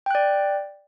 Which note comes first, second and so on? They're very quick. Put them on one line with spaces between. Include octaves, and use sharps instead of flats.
G5 F#6 D5